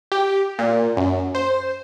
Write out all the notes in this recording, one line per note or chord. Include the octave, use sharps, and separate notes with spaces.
G4
A#2
F#2
C5